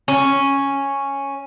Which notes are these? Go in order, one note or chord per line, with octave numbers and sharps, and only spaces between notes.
C#4